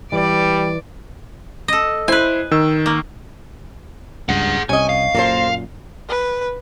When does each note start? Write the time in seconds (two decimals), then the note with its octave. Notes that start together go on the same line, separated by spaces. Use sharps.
0.12 E3 G3 D5
1.68 A4 D#5
2.08 E4 B4 C5 G#5
2.51 D#3 E6
2.86 A#3
4.29 C#2 G2 G#4 F#5
4.69 C2 C3 C#4 D#5 G#5
4.89 F5
5.15 F#2 A#2 A#3 A4 C5
6.09 B4